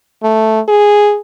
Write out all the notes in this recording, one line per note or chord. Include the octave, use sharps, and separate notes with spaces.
A3
G#4